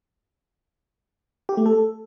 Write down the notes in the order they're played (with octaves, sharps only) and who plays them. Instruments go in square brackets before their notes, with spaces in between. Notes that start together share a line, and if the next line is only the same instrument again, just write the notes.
[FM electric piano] G4
A3
A4